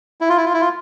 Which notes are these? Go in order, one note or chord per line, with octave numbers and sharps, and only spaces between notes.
E4
F4
E4
F4
E4
F4